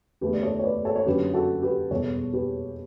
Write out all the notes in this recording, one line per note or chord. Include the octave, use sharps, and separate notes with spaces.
E2 D3 A3 G4 B4
D5
A4 C#5
C#5
B4 D5
A4 C#5
C#5
F#2 D3 F#3 G4 B4
F#4 A4
G4 B4
E2 B2 G3 B3 A4 C#5
G4 B4